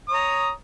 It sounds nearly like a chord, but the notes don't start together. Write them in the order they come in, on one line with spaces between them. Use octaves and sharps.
D#6 C#5 A#5